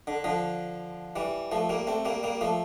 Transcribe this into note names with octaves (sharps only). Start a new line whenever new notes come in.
D3
D3 F3
E3 G3
F3 A3
G3 A#3
A3 C4
G3 A#3
G3 A#3
F3 A3